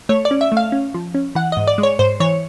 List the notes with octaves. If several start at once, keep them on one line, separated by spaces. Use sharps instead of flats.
A3 C#5
D5
C#4
E5
A3
F5
C#4
F3
C#4
E3 F#5
G#2 D#5
D5
G#3
C#5
G#2 C5
E3 C#5